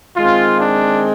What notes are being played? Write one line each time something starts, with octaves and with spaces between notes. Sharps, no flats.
D#3 G#3 C4 F4
D4